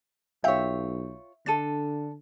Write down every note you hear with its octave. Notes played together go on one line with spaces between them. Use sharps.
B1 F4 C#5 E5 F5 G5 G6
D3 D4 A4 A6 D#7